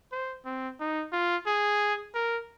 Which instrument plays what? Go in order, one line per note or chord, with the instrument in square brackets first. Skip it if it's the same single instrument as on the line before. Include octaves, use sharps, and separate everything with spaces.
[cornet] C5
C4
D#4
F4
G#4
A#4